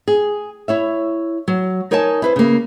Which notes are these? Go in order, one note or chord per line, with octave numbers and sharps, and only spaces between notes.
G#4
E4 C#5 E5
F#3
D#4 A#4 C#5 D#5 G#5 A5
E4 B4 C5
C#3 A#3